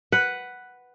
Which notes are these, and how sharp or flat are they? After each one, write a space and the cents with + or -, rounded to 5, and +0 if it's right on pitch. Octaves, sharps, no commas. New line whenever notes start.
B4 +0 F#5 +5